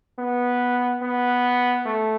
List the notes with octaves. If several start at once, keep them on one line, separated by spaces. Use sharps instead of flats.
B3
B3
A3